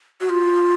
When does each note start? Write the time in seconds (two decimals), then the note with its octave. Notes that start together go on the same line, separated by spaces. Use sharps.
0.21 F#4
0.29 F4